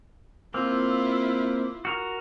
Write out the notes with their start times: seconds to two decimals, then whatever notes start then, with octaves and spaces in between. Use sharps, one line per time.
0.54 A#3 C4 E4 F4
1.85 F#4 A#4